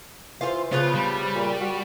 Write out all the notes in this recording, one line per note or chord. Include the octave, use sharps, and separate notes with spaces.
E3 F4 A4 C5
C#3 F3 B3 F4 B4
G3
A#2
F#4